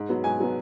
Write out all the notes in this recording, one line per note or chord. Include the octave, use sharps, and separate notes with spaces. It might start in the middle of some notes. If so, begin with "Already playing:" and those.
Already playing: G#2
F#3 B3
G#2 G#5
F#3 B3